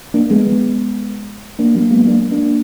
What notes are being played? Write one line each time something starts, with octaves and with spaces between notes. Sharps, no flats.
A#3 D4
G#3 B3
G#3 B3
A#3 D4
F#3 A#3
G#3 B3
A#3 D4
A#3 D4